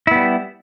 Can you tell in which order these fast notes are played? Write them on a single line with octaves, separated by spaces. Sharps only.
E4 B3 G3